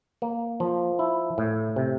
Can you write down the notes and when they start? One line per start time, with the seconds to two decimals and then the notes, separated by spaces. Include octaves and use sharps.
0.22 A#3
0.60 F3
0.99 E4
1.38 A2
1.76 C3